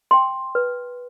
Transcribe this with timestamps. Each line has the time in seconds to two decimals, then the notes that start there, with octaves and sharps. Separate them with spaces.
0.11 G5 C6
0.55 B4